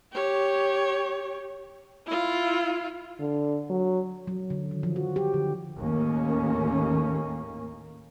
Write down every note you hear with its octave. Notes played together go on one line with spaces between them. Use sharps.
G4 C#5
E4 F4
D3
F#3
F#3
D3
D#3
F3
F#4
G4
D3
D#2 A2 A#3 C#4